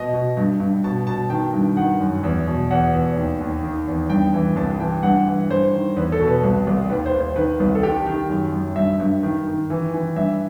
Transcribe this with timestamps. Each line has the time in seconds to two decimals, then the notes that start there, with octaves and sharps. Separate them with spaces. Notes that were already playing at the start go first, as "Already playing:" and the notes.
Already playing: B2 D#5
0.13 B2
0.37 G2
0.60 G2
0.84 B2 A5
1.07 B2 A5
1.30 D#3 G5
1.54 G2
1.77 D#3 F#5
2.00 F#2
2.23 E2
2.47 B2
2.71 E2 F#5
2.93 E2
3.16 D#2
3.40 D#2
3.64 D#3
3.87 E2
4.09 G2 G5
4.34 E3
4.56 C2 A5
4.80 E3 G5
5.03 G2 F#5
5.27 E3
5.49 G2 C5
5.74 D#3
5.96 E2 B4
6.12 A4
6.20 B2
6.28 B4
6.43 C2
6.67 C2
6.89 D#2 B4
7.06 C5
7.13 D#2
7.20 C5
7.36 D#3 B4
7.60 C2
7.75 A4
7.83 D#3 G4
8.06 D#3
8.30 F#2
8.53 F#2
8.76 G2 E5
9.00 G2
9.23 D#3
9.47 D#3
9.70 E3
9.94 E3
10.16 G2 E5